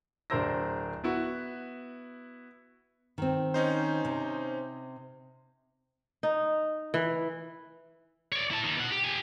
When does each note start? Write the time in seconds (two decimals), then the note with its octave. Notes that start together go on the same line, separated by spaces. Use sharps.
0.30 D1 D4 A#4 C5 E6 A#6
1.04 B3 E4 F#4
3.18 D#3 C4
3.54 C#4 D#4 C5
4.05 C3
6.23 D#4
6.94 E3
8.32 C#5 D5
8.51 E4 A5
8.64 D#2 D#3
8.77 B2 F#5
8.91 G4
9.04 G4 G#5